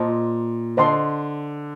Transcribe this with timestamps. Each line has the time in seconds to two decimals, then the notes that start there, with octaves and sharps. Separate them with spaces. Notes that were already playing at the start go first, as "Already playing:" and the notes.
Already playing: A#2 C5 D#5 A5 C6
0.77 D3 C5 D#5 A5 C6